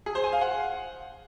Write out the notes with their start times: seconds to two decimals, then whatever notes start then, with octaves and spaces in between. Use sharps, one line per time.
0.06 G#4
0.15 C5
0.24 G#5
0.33 F5
0.41 F#5